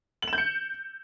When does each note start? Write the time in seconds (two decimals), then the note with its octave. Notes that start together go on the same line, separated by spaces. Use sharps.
0.22 F#7
0.28 E7
0.33 G6
0.38 C#7